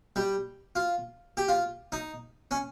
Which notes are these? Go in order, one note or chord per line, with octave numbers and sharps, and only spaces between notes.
G3
F4
G4
F4
D#4
C#4